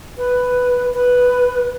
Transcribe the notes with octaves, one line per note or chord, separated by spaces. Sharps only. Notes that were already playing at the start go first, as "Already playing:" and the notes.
B4
B4